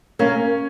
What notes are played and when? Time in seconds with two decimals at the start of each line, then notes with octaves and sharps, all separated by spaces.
0.19 A#3 C#4